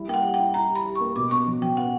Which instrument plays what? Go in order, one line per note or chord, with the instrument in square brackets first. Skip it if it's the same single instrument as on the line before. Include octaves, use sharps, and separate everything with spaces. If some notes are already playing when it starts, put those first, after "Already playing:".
Already playing: [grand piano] G3 E4
[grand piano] A#3 [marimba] G5
[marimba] F#5
[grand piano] G4
[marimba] G5
[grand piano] E4
[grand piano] E4 [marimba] A#5
[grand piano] G4
[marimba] B5
[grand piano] G4
[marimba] C#6
[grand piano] A#3
[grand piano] B2 [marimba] D6
[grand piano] B3 [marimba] C#6
[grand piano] F#3
[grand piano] F#3 [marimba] G5
[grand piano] B3 [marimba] F#5